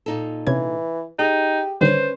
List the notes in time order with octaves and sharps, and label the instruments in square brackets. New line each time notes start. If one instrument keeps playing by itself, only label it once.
[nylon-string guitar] A#2 D#4 A4
[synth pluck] C3 C#4 G#6 [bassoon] E3
[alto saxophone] D#4 [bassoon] G4 [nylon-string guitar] G#4
[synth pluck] D3 D#3 G3 [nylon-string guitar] C#4 B4 [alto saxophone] C5